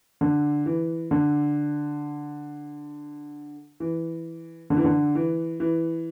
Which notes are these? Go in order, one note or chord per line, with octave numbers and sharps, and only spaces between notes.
D3
E3
D3
E3
D3
E3
D3
E3
E3